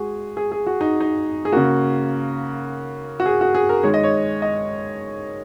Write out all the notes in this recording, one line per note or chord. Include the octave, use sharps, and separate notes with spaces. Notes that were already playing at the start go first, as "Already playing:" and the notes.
Already playing: G#3 F#4 G#4
G#4
G#4
F#4
D#4
D#4
G#4
C#3 A#3 F#4
F#4
G#4
F#4
G#4
A#4
D#3 G#3 C#5
D#5
C#5
D#5